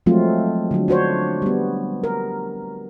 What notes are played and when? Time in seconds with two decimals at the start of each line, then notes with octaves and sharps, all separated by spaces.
0.06 F3 F#3 G#3 A3 C4 F4
0.71 D3 F#3
0.88 D4 F#4 C5 C#5
1.42 G3 B3
2.04 A#4